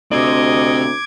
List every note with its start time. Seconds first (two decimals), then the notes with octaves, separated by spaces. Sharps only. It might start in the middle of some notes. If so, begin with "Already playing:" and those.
0.11 D2 C3 C4 D#5 D6 G#6